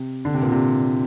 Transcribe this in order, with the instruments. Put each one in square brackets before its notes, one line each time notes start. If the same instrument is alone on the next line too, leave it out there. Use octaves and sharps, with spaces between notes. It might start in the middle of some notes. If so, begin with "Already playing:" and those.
Already playing: [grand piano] C3
D3
C3
A#2
C3